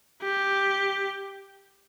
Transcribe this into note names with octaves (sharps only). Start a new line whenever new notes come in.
G4